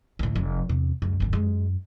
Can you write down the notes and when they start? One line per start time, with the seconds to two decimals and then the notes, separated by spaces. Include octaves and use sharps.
0.19 D2 A2
0.35 F1 F#3
0.69 E2 C3
1.02 C#2 F#2
1.20 G1 D#2
1.33 G#3